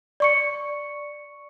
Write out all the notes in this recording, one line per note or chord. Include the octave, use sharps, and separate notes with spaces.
D5 C#6 C#7